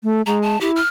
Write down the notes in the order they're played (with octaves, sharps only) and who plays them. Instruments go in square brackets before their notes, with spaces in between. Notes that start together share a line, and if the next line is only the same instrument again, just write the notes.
[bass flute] A3
[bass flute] G#3 [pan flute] A#5
[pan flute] A5
[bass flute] E4 [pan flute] G4
[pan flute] F6